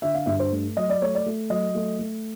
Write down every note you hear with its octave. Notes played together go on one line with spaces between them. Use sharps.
D3 E5
F5
G2 E5
C5
A3
F#3 D#5
D5
A3 C#5
D5
A3
F#3 D#5
A3
A3